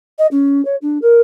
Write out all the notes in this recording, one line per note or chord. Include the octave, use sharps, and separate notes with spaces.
D#5
C#4
C#5
D4
A#4